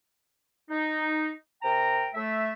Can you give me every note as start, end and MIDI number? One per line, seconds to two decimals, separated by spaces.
0.70 1.30 63
1.63 2.07 48
1.63 2.07 70
1.63 2.07 79
1.63 2.07 82
2.14 2.53 57
2.14 2.53 76